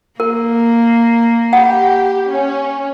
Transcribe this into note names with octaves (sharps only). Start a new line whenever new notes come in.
A#3 A#4
G4 F#5 B5
C#4